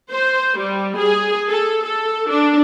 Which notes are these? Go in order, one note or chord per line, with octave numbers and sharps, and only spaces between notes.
C5
G3
G#4
A4
A4
D4